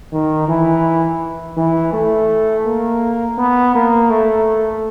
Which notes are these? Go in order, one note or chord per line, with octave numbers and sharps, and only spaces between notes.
D#3
E3
E3
A3
A#3
B3
A#3
A3